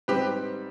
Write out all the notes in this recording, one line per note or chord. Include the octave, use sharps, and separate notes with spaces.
G#2 G3 C4 G4 B4